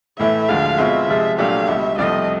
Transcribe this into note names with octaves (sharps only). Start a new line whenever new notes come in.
A2 E3 A3 E5
D2 D3 F3 G#3 F5
B2 G#3 C4 F4 E5
C3 F3 G#3
A#2 F#3 A3 D4 G4 F5
C#2 B2 G3 E5
C2 C3 F3 A3 D#5